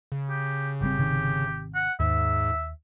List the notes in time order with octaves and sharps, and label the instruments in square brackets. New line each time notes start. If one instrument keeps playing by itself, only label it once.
[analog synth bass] C#3
[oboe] G4
[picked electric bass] G#1 G3 C4 [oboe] G4
[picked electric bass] G#1 C3 D#3
[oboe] F#5
[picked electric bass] D#2 [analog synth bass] G#2 [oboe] E5